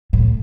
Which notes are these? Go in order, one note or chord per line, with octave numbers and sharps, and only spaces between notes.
A2